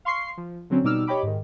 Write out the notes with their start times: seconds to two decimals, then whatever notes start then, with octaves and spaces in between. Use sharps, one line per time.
0.05 F5 C6 C#6 C7
0.37 F3
0.70 D3 F#3 C4 C#4
0.84 B2 G3 D#4 D6 E6 F6
1.07 G4 C#5 D#5 G5 B5 D6
1.23 G#2 D#3